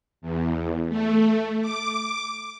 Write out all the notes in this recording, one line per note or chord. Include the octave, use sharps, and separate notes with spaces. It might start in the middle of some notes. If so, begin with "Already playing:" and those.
E2
A3
D6